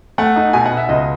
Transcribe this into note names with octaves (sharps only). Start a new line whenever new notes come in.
A3 F#5
D#4
B2 G#5
F#5
B2
E5
C#2 D#5